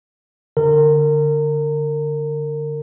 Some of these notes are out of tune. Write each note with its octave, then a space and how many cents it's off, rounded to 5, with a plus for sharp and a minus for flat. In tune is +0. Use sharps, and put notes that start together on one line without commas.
D3 -5 A#4 -30